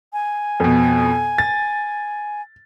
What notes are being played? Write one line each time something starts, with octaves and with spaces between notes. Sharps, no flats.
G#5
F2 B2
A6